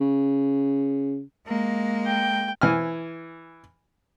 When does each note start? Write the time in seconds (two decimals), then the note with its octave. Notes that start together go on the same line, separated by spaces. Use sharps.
0.01 C#3
1.46 G#3 A#3
2.06 G5
2.61 E3 G#5 F6